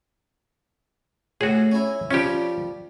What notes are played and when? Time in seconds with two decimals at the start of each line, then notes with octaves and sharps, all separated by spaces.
1.41 A2 F#4 G#4
1.72 C#4 E4
2.11 F3 G3 C#4 G4